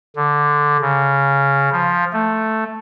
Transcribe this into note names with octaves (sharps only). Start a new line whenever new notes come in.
D3
C#3
F3
A3